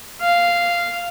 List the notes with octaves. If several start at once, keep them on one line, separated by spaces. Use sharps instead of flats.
F5